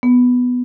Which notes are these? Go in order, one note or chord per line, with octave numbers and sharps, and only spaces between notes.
B3